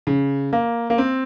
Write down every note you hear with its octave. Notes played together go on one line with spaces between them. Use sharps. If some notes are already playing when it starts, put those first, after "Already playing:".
C#3
A#3
A#3
C4